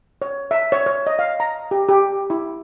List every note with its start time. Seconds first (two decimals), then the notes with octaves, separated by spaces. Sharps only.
0.22 C#5
0.51 E5
0.72 C#5
0.86 C#5
1.07 D#5
1.19 F5
1.40 A#5
1.71 G4
1.89 G4
2.30 E4